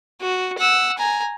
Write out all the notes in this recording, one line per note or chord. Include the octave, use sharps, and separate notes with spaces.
F#4
F#5 E6
G#5 A#5